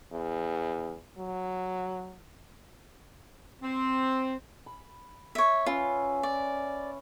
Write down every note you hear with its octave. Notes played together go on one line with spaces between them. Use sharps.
E2
F#3
C4
B5
C#5 E5
C#4 F4 B4 E5
D5